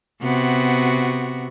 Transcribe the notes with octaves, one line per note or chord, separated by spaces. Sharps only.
C3 B3 F#4